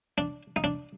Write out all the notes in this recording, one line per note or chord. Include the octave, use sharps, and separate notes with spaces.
D4
D#4
D4